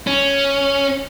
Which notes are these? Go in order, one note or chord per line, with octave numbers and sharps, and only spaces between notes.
C#4